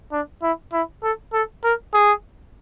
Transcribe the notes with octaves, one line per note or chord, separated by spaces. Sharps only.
D4
E4
E4
A4
A4
A#4
G#4